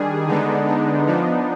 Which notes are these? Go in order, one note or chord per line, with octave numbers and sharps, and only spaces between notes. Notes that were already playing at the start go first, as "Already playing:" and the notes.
Already playing: D#3 G3 D4 G#4
D3 G#3 B3 D4 D#4
D4
F3 B3 D4 D#4